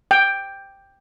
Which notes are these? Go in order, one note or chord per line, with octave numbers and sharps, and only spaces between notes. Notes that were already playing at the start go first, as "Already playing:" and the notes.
G5